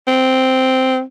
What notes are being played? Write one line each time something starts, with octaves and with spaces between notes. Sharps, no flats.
C4